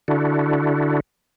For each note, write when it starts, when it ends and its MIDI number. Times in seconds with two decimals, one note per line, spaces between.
0.08 1.00 50
0.08 1.00 62
0.08 1.00 64
0.08 1.00 66